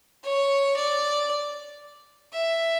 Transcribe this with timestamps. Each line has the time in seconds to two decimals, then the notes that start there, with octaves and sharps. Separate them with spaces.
0.24 C#5
0.76 D5
2.33 E5